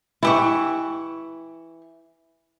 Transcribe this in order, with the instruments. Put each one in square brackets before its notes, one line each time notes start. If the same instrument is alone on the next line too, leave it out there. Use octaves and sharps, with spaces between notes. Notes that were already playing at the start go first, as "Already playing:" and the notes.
[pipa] E3 G4 C#6 [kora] E4